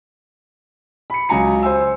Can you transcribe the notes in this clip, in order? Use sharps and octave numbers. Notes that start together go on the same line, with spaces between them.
B5 C#7
C#2 F#3 G#5 A#5 C#7
C5 G#5 E6